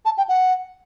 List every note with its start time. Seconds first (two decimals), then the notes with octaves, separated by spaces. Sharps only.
0.05 A5
0.18 G5
0.29 F#5